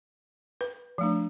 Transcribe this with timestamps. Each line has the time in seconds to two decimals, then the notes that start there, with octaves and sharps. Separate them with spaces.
0.61 B4
0.98 F3 A3 D4